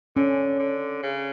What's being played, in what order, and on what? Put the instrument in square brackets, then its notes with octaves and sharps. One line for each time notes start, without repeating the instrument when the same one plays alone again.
[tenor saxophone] D3 [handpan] C#4
[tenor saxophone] D3
C#3